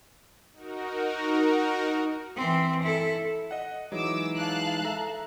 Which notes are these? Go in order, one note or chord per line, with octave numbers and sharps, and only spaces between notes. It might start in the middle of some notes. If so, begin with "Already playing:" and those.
D#4 F#4 A#4
E3 C4
E4 A4
D#5 F#5
E3 F#3 G#3 D#4 D6 E6
F5 A5 F#6
A4 E5 A#5